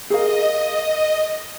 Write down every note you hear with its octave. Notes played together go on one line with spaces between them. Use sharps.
G#4 A#4 D#5 F5